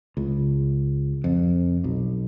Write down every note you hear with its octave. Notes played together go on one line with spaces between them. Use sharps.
C#2
F2
B1